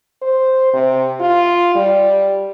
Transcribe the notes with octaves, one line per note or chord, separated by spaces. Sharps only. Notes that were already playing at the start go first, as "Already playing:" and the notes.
C5
C3
F4
G3